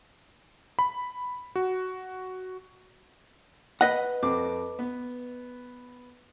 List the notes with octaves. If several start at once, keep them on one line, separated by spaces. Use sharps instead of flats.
B5
F#4
B4 D#5 F#5
F2 C4 D6
B3